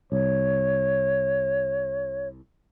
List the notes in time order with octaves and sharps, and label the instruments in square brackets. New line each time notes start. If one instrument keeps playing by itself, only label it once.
[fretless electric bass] C2 [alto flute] C#5